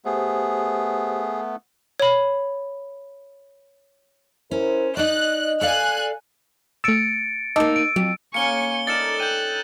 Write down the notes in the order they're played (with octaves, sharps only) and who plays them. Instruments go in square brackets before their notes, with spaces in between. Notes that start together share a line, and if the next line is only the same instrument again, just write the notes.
[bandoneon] A3 B3 [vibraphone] G4 C5 [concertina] G#4
[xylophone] C#5 B5
[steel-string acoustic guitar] C#4 [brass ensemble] E4 A#4 C5
[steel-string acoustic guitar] D#4 D5 [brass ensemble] D#5 [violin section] F#6
[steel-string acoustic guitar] A4 D5 F5 [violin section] G#5 F#6
[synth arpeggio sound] A3 E6 [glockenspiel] A6 C#7 D7
[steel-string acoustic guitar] A#3 D#4 [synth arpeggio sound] D#5 A5 D6 [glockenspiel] E6
[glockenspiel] D7 D#7
[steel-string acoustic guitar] F2 [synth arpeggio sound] F#3
[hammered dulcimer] A#3 C#4 [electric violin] G#5 C#6 [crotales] C#7 G7
[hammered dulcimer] D#4 A4 A#4 [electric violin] D5 [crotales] A6 C#7 E7
[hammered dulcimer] G5 [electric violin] F#6 [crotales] G6 D#7